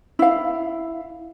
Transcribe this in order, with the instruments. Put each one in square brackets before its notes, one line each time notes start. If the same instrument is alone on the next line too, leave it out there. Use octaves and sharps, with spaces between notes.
[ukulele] E4 F5